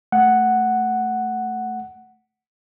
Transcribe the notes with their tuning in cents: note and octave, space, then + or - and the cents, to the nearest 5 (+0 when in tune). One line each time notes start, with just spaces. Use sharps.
A3 +0 F#5 +0